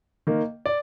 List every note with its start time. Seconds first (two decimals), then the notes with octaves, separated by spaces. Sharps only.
0.27 D#3 A#3
0.66 D5